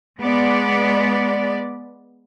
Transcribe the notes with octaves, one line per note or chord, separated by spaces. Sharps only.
G#3 B3 D5